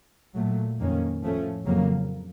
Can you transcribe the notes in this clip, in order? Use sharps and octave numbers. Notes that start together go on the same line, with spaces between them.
A#2 F#3 A3
F2 D#3 A#3 C#4
A2 F3 A3 C#4
F2 C#3 F#3 A#3